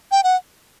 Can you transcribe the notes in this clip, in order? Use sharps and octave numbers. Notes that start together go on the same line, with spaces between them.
G5
F#5